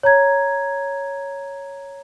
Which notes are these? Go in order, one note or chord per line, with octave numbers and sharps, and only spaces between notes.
C#5 A#5 G#6